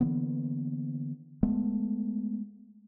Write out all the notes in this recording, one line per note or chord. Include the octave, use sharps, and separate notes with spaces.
D3 E3 A#3 B3
G#3 A3 B3